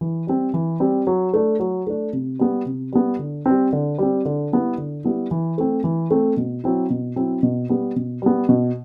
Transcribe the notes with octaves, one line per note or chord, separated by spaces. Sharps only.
E3
G3 C4
E3
G3 C4
F#3
A3 D4
F#3
A3 D4
C3
G3 B3
C3
G3 B3
D3
G3 C4
D3
G3 C4
D3
G3 B3 E4
D3
G3 B3 E4
E3
A3 C4
E3
A3 C4
B2
F#3 C4 E4
B2
F#3 C4 E4
B2
G3 B3
B2
G3 B3
B2